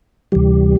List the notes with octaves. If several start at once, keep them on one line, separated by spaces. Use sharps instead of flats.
D2 C3 E3 G3 G4